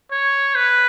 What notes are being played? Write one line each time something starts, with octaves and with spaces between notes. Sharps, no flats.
C#5
B4